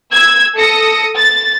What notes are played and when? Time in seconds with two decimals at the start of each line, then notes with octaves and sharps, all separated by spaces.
0.11 E6 G#6
0.58 A4 D#6 A#6 C#7
1.18 A6